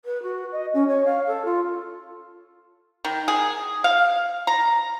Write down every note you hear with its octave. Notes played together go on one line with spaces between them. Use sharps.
B4
F#4
D#5
C#4
C#5
F5
A4
F4
D#3
G#4
F5
A#5